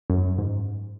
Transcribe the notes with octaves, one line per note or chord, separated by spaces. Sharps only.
F#2
G#2